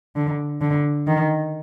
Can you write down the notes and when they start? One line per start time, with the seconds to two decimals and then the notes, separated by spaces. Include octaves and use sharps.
0.16 D3
0.61 D3
1.07 D#3